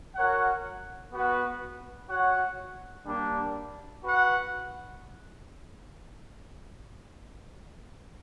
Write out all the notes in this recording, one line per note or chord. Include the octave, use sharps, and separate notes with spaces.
F#4 A#4 C#5 F#5
B3 F#4 B4
F#4 C#5 F#5
G3 A#3 D4
F#4 B4 F#5